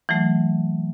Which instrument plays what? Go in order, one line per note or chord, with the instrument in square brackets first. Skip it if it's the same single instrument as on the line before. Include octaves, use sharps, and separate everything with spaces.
[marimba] E3 F#3 A3